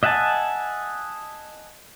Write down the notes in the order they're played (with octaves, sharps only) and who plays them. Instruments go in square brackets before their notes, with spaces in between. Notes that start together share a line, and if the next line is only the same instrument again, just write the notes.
[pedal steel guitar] D#5 E5 F#5 G#5 A5